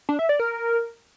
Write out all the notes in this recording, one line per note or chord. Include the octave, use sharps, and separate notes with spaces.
D4
E5
D5
A#4